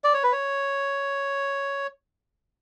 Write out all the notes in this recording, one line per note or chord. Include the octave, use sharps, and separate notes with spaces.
D5
C#5
B4
C#5